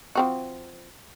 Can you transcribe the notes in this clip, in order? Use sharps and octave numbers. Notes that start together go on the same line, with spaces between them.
F3 C4 F#4